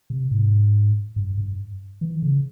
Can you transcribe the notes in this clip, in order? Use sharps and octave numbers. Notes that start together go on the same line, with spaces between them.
C3
G#2
G2
G2
E3
C#3